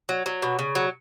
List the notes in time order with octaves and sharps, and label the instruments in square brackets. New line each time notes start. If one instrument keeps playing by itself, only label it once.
[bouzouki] F#3
F#3
B2
C#3
F#3